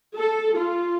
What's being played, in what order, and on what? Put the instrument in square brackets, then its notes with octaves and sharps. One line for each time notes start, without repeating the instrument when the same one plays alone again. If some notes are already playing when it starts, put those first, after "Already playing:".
[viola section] A4
F4